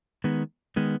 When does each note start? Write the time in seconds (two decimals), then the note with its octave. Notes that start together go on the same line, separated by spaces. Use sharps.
0.24 D#3 G#3 B3
0.76 D#3 G#3 B3